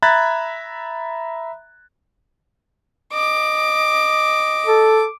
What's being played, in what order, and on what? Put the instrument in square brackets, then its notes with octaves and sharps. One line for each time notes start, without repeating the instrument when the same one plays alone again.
[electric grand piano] E5 A#5 B5 F#6 G#6 A6
[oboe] D#5 [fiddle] D6
[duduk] A4